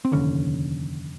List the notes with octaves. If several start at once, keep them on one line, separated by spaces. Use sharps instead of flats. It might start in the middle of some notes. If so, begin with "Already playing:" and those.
C4
F1 D#2 D3 C#4